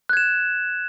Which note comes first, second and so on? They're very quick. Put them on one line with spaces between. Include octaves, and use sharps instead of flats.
F#6 G#6 E7